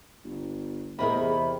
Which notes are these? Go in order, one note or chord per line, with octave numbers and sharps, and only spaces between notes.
G1
E2 C3 G#4 A#4 D#5 B5